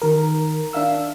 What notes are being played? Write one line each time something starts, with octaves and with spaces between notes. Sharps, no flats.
D#3 A#4
D4 E5 F5 E6